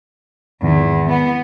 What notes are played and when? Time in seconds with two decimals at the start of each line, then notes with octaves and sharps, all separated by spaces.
0.62 E2 G#2 D#3
1.09 B3